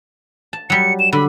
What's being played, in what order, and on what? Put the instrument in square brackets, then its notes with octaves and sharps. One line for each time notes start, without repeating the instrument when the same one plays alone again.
[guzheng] A5
[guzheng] F#3 G3 [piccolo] C#7
[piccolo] E7
[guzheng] D3 [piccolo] B5